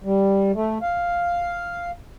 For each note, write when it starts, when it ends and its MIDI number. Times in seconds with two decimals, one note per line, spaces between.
0.04 0.52 55
0.54 0.78 57
0.82 1.91 77